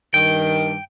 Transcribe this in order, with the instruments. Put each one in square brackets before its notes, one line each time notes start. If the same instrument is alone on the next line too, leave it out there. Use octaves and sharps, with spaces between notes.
[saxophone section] G2 D#3 [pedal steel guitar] G5